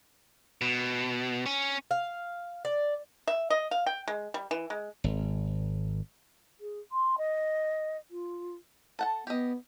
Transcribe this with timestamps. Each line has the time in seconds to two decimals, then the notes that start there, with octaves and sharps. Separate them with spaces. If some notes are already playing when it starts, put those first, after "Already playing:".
0.61 B2
1.46 C#4
1.91 F5
2.65 D5
3.28 E5
3.50 D#5
3.71 F5
3.86 G5
4.08 G#3
4.34 G3
4.51 E3
4.70 G#3
5.04 G#1
6.60 G#4
6.91 C6
7.18 D#5
8.10 F4
8.99 A4 F#5 A5
9.27 B3 G4 D#5